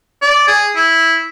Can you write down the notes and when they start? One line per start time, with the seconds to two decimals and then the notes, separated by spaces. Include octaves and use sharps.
0.22 D5
0.48 G#4
0.76 E4